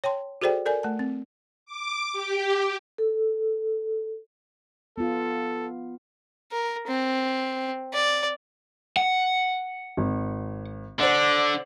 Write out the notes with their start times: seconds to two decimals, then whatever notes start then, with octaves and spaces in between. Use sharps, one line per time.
0.04 C#5 G5 A5 C6
0.41 F#4 G#4 A4 C5 D5 G5
0.66 A4 A#4 D5 G#5
0.83 A3 A5
0.99 C4
1.66 D6
2.13 G4
2.98 A4
4.98 B3 F4 A4
6.52 A#4
6.88 C4
7.94 D5
8.97 F#5
9.97 G#1
10.99 D3 C5 D5 F#5